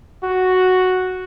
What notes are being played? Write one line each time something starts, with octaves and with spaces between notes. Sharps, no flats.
F#4